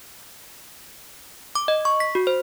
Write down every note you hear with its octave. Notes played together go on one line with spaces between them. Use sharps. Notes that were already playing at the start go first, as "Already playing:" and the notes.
D6
D#5
C#6
B6
F#4
C5